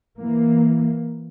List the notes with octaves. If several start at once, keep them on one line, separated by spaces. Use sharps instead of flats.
E3 A#3